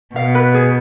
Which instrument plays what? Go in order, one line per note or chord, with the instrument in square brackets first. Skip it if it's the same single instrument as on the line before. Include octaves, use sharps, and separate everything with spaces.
[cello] B2 [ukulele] F5
[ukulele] B4
G#4